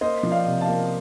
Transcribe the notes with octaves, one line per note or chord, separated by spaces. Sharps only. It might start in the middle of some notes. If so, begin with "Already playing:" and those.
A#3 C5 D#5
F3
D5 F5
C3
F5 A5
A#3